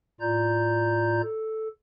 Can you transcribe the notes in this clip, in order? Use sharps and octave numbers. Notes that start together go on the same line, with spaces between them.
A2 F4 D5 A#5 G6
A4